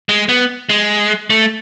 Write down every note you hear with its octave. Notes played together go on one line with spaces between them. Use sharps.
G#3
B3
G#3
A3